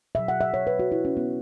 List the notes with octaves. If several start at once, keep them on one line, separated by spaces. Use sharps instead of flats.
B2 F#3 E5
F#5
E5
C#5
B4
F#4
E4
C#4
B3